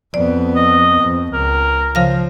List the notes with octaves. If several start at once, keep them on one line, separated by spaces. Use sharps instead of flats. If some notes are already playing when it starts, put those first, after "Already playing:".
F2 B3 D5
D#5
F2
C#2 A#4
C#3 F3 F5 A#6